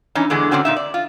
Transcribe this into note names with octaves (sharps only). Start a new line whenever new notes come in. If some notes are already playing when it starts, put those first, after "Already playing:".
E3 C#4 D#4
E2 D3 E3 G#3
G#2 B2 D3 C4 C#4 F#4
A#2 D#4 E5
D5
F4